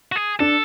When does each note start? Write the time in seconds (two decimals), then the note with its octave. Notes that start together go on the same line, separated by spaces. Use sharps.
0.12 F#4
0.16 G#4
0.40 D4 A4